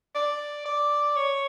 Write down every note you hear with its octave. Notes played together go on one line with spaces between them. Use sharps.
D5
D5
C#5